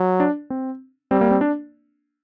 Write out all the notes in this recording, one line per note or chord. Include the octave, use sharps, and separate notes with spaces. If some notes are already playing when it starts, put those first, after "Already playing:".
Already playing: F#3
D4
C4
G3 C4
A#3
C4
D4